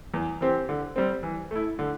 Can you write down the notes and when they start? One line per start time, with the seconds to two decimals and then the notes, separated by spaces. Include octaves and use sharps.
0.14 E2
0.41 E3 C4 G4
0.69 D3
0.96 G3 C4
1.23 E3
1.51 A3 E4
1.79 D3